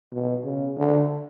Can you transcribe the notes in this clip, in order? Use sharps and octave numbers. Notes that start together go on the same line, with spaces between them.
B2
C#3
D3